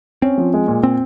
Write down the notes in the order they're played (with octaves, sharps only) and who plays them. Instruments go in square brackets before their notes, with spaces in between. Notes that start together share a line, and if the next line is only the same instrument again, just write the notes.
[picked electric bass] C4 [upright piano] C#4
[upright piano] F3
G#3
A#2
[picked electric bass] C4